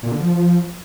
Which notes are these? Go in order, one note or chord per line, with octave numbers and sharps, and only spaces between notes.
A#2
D3
F3